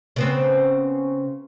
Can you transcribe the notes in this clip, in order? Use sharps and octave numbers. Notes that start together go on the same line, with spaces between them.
C#3 B3 C4